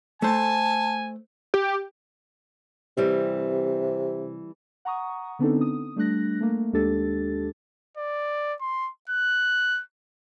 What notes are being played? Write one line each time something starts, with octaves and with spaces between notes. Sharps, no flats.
A3 A4 C5 G#5 A5
G4
C3 E3 G3 C4
F#5 A#5 C#6 D#6
D3 B3 C4 D4 D#4 A4
D#6
G3 A3 D4 F#6 A#6
A3 A#3
D#2 G#3 D4 G4 A4 A6
D5
C6
F#6